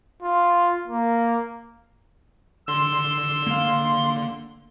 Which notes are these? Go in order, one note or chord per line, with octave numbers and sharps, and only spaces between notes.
F4
A#3
D3 C6 E6
A#3 F5